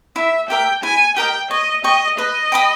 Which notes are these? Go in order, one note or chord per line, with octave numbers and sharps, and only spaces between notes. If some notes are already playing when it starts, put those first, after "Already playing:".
E4 E5
G4 A#4 E5 G5
E4 G#5
G4 A#4 D#5 G5
C#5 D#5
D#5 G5 C#6
B4 D#5
G5 B5 D#6